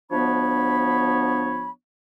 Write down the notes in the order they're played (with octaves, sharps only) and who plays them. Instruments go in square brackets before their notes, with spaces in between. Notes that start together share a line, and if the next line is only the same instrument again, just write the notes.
[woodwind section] D2 F3 B3 D4 C#5 B5